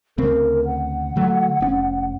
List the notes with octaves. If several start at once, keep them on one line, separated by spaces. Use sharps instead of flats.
D2 C#3 C4 A#4
F#5
D3 F#3 A3
F1 C4 C#4